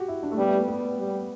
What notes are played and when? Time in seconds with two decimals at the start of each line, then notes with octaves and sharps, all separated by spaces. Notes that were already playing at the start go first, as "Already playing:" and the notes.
Already playing: F#4 G4
0.08 E4
0.23 D4
0.31 A3
0.38 G3 B3
0.48 A3
0.58 B3
0.68 B3
0.98 G3